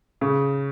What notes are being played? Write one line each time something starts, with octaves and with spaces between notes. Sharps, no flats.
C#3